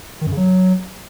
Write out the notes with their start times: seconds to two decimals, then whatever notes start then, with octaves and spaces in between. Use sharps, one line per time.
0.21 D#3
0.27 F#2
0.32 C#3
0.37 F#3